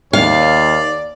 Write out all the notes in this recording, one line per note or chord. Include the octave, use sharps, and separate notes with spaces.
D#2 D5 F5